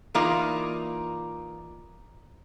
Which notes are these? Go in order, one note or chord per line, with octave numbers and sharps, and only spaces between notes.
E3 A#3 D#4 F4 D5